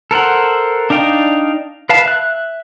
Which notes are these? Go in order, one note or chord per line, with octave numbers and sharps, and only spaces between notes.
A4 A#4 C5 F#5
D4 D#4 F5 G5
B4 F5 A5
E5 F#6